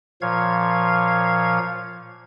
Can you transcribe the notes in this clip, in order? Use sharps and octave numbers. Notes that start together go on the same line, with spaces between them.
A#2 F3 C#5 F5 G#6